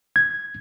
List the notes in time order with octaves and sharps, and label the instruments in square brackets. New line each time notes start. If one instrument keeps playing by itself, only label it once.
[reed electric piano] G#6